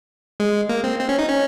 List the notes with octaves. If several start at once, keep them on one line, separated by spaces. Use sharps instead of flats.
G#3
A#3
C4
C4
C#4
D#4
C#4